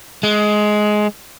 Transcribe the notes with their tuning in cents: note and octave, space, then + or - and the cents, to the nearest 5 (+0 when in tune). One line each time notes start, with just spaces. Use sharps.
G#3 +15